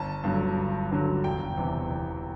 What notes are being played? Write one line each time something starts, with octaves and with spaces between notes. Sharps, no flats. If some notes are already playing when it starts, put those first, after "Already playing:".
Already playing: G1 A5
G2 D3 F#3
G1
G2 D3 F#3
E1 G5
E2 C3 E3
E1